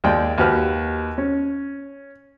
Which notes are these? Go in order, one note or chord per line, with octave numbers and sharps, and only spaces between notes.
D#2 G#3 D5 G5
D#2 F#4 G4 B4 F6
C#4